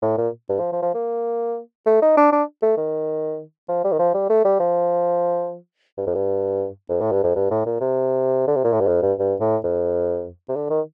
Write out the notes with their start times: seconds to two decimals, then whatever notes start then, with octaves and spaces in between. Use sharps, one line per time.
0.02 A2
0.18 A#2
0.49 G2
0.59 F3
0.72 F3
0.82 F3
0.94 A#3
1.86 A3
2.02 D#4
2.17 D4
2.32 D4
2.62 A3
2.77 D#3
3.69 F3
3.84 G3
3.92 D#3
3.99 F3
4.14 G3
4.30 A3
4.45 G3
4.60 F3
5.97 G2
6.07 F2
6.15 G2
6.89 F2
7.01 A2
7.12 G2
7.24 F2
7.36 G2
7.51 A2
7.66 A#2
7.81 C3
8.47 D3
8.56 C3
8.64 A#2
8.73 A2
8.81 G2
8.87 F2
9.02 G2
9.19 G2
9.40 A2
9.64 F2
10.49 C3
10.56 D3
10.70 D#3